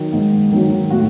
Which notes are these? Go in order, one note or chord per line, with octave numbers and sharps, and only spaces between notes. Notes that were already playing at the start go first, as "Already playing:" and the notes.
Already playing: D#3 F#3
G#2
D#3 F#3
A2 F#4